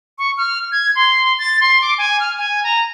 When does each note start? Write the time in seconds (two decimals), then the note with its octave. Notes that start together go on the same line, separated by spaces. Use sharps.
0.18 C#6
0.37 F6
0.72 G#6
0.96 C6
1.39 A6
1.61 C6
1.82 D6
1.98 G#5
2.20 F6
2.38 G#5
2.64 A#5